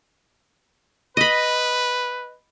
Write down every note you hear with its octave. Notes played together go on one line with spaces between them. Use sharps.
B4 D#5 B5